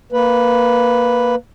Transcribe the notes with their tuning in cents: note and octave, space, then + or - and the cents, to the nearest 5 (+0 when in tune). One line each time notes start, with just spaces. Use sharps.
A#3 +0 B4 +0